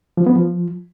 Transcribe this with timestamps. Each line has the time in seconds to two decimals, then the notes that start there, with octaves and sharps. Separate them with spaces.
0.17 F3
0.26 B3
0.36 F3